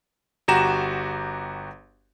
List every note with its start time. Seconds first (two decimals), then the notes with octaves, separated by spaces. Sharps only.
0.48 G1 F#4 G4 A#5 E7